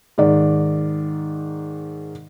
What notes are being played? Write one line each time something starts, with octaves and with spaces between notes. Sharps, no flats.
G#2 D#3 D5